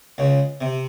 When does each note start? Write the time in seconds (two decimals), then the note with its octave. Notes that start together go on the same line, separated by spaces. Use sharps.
0.18 C#2 C#3
0.61 C3